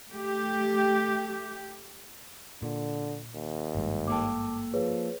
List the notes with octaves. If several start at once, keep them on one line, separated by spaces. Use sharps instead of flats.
A3 G4
A#2 D3
D#2
G#1 G2 G#3
A#3 A4 G5 A5 D6
F3 G#4 B4 C#5